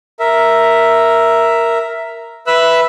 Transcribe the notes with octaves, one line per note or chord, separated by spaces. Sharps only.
A#4 E5
B4 E5 E6 F#6